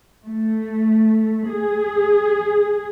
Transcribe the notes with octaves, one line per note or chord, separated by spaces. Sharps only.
A3
G#4